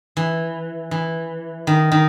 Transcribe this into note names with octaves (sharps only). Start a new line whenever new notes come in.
E3
E3
D#3
D#3